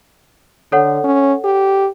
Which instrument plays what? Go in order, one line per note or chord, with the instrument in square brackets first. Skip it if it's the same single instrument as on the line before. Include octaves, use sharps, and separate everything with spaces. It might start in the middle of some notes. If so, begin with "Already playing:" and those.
[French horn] D3 [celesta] A4 C#5 F#5
[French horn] C#4
G4